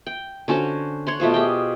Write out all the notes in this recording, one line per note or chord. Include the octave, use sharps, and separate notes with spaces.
G5
D3 C#4 F#4 C5
C#5 F#5 C6
B2 A3 F4 C5
G4 G#4 G5